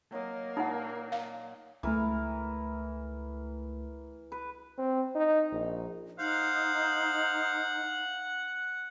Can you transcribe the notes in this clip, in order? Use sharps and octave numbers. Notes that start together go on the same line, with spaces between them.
F#3 A#3 D#4 D#5
A#2 D#4 E4 F#5
F5
C#2 E3 A3 A#4
B4
C4
D#4
A#1
D#4 C5 F5 F#5